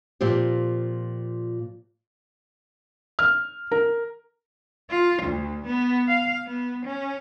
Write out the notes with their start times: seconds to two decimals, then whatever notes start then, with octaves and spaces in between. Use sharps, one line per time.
0.21 A#2 F3 C4 G4
3.19 F6
3.71 A#4
4.90 F4
5.22 D2
5.65 B3
6.07 F5
6.46 B3
6.85 C#4